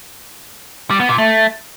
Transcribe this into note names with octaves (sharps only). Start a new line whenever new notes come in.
G3
B3
A#2
A3